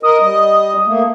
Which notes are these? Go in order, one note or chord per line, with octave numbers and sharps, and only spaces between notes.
A#4 D#5 D#6
G3 D#5
A3 A#3